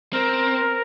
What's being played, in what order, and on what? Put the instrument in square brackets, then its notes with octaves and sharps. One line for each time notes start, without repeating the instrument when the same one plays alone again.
[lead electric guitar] C4 [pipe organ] A#4